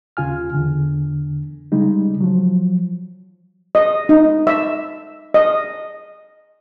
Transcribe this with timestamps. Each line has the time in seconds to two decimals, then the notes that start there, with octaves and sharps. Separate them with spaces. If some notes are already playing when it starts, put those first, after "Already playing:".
0.17 D#2 C#3 F4 G#5 F6
0.54 E2 D3
1.72 C#3 G3 G#3 D#4
2.21 F3 F#3
3.75 D#5
4.09 D#4
4.47 E5
5.34 D#5